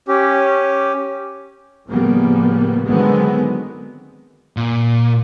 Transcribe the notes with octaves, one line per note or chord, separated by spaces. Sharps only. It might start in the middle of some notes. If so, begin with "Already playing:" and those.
C#4 G4
A2 C#3 F3 G3 A#3 B3
D3 D#3 F#3 G#3 B3 C4
A#2